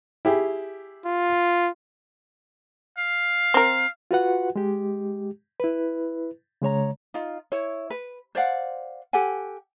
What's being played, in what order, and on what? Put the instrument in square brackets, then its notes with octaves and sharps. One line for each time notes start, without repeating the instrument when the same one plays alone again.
[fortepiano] E4 G4 G#4
[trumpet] F4
[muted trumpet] F5
[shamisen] C4 A#4
[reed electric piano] F4 F#4 B4 F#5
G#3 G4
E4 B4
C#3 G#3 C#5 A#5
[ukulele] D#4 F4
E4 C#5
B4
C5 D5 F5 F#5
G4 A4 F#5 G#5